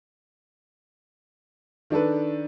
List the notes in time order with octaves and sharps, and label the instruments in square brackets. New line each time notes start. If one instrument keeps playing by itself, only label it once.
[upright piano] D#3 D4 A4 B4